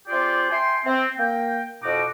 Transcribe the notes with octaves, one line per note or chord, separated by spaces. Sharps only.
C4 F4 G4 G#4 D5
E5 G5 G#5 C6
C4
A#3 G5
F2 B2 D#4 F#4 D6